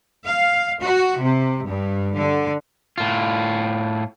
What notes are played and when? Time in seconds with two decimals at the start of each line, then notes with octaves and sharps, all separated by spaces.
0.25 F5
0.80 F#4
1.18 C3
1.66 G2
2.15 D3
2.98 A2 F4